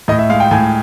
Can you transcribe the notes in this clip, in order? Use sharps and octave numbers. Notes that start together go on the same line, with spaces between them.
A2 D#5
E5
G#3 F5
G5
A2 G#5